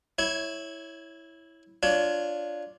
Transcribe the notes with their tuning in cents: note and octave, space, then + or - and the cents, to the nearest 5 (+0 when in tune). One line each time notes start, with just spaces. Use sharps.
E4 -10 C#5 +0
D4 +0 F4 +0 C#5 +15